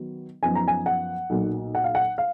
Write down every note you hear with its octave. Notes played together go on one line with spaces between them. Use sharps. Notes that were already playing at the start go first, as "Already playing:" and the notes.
Already playing: D#3 F#3 B3
F#2 F3 B3 D#4 G#5
A#5
G#5
F#5
B1 A#2 F#3 A#3 D#4
F#5
F5
F#5
F5